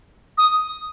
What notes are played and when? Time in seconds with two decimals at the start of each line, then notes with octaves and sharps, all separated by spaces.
0.38 D#6